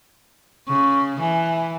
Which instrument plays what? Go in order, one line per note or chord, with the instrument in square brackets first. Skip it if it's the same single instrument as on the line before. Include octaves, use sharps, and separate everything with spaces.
[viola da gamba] C#3 [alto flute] C#6
[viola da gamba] E3 [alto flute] G#5